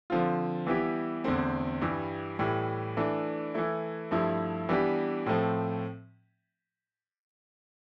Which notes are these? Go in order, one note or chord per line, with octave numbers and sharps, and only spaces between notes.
D3 F3 C4 F4
E3 G3 B3 E4 G4
E2 D3 A3 C4
G2 E3 G3
A2 E3 G3
E3 A3 D4
E3 A3 E4
G2 F3 A3 E4
E3 G3 B3 D4 G4
A2 F3 A3 C4